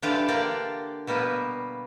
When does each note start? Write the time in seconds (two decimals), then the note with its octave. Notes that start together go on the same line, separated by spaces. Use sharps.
0.02 D3 E3 D4 F4 G4 D5
0.28 A#3 D4 G4 D5 G5
1.07 B2 G3 A#3 B3